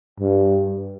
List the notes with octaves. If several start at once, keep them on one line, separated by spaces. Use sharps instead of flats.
G2